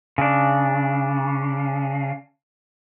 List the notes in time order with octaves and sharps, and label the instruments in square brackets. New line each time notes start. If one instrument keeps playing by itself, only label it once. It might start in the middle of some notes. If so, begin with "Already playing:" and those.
[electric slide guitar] C#3 D4